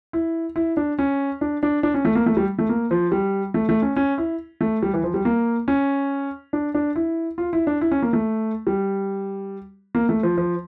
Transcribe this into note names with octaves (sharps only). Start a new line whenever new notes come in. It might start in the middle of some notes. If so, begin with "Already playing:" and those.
E4
E4
D4
C#4
D4
D4
D4
C#4
A3
A#3
A3
G3
A3
A#3
F3
G3
A3
A3
C#4
C#4
E4
A3
G3
E3
F3
G3
A#3
C#4
D4
D4
E4
F4
E4
D4
E4
C#4
A#3
A3
G3
A#3
A3
F3
F3